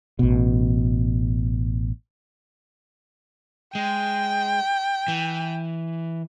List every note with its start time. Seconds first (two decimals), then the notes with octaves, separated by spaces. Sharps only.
0.19 A1 B2
3.75 G#3 G5
5.08 E3